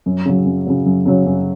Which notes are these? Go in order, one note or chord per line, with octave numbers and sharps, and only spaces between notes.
F#2
C#3 F#3
F#2
C#3 F#3
F#2
C#3 F#3
F#2